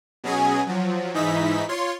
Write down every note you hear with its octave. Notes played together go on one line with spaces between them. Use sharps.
B2 F#3 C#4 G#4 G#5
F3 F#3
G#2 E3 D#4 E4 B6
F4 C#5 C6